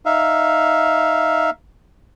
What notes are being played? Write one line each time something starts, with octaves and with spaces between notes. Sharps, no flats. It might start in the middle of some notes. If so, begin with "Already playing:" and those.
D#4 E5 F5